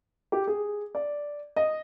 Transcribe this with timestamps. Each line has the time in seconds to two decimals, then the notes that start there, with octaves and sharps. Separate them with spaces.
0.32 G4
0.47 G#4
0.95 D5
1.56 D#5